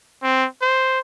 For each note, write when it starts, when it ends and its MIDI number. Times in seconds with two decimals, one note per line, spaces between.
0.23 0.47 60
0.62 1.00 72